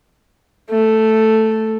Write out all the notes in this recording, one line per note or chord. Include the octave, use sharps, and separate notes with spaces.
A3